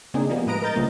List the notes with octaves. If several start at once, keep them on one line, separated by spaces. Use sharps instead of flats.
C#3 A#3 C4 D4 D#4 G#4
F3 G3 A#3 B3
A2 G#3 B4 D#5 A#5 D7
A#4 D#5 A#5 G6 A6
C#2 C#3 F3 G3 A3 A#3